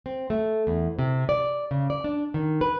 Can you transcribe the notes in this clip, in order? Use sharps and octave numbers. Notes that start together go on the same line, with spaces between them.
C4
A3
E2
C3
D5
C#3
D5
D4
D#3
B4